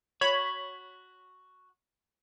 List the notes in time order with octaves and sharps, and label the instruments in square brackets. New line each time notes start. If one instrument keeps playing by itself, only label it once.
[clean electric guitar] F#4 [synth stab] C#5 B5